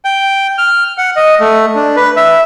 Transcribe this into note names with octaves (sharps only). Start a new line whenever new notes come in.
G5
F6
F#5
D#5
A3
D4
B4
E5